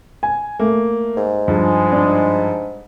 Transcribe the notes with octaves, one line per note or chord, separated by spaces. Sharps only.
G#5
A3 A#3
G#2
G2 F3 G#3
D4